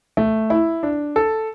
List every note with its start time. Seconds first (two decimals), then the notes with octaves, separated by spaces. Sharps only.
0.17 A3
0.50 E4
0.83 D4
1.16 A4